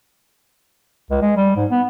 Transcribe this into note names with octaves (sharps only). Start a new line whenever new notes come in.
C#2
G#3
G3
G#2
B3